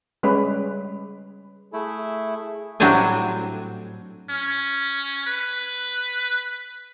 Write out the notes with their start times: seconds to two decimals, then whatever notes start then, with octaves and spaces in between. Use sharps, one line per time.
0.23 G3 G#3 C#4 B4
1.73 A3 E4 G#4
2.80 A2 F#3 G3 C4 D4 G#5
4.30 C#4
5.27 B4